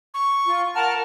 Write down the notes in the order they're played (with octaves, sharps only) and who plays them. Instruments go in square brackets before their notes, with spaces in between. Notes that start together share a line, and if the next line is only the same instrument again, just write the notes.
[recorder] C#6
[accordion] F4
[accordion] A#4 A5 F6 [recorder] F#5